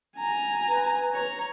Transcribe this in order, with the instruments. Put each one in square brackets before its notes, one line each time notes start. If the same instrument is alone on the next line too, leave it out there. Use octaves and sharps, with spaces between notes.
[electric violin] G#5 A#5
[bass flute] B4
[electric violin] C#5 A#5